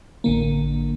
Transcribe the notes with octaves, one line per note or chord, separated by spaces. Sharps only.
A1 D3 A#3